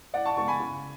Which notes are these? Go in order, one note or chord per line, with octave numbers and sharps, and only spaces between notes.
A2 D5 F#5
A5 C#6
G#3 B3 A5 C#6
G#5 B5
C#3